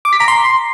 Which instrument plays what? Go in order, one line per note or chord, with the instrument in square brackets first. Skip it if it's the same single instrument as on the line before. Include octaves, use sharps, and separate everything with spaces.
[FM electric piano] D6
B6
A#5
C6